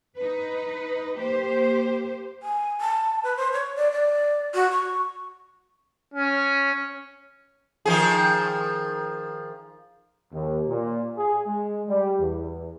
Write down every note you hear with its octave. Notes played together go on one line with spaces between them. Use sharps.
D#4 B4
A#3 G4 C5
G#5
A5
B4
C5
C#5
D5
D5
F#4
C#6
C#4
D#3 F3 G#4
D#2
A#2
G#4
G#3
G3
E2